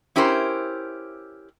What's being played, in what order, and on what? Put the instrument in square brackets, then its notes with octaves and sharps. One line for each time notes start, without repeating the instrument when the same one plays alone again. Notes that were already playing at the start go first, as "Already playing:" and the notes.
[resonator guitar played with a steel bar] C#4 E4 G4 A#4 C5